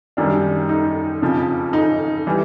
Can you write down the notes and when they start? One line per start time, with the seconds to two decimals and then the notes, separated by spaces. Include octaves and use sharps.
0.17 F#2 D#3 G3 D4
0.69 D#4
1.22 F2 C#3 F3
1.73 D#4
2.27 E3 G3